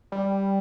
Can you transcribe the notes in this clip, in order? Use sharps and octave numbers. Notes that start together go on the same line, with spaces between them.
G3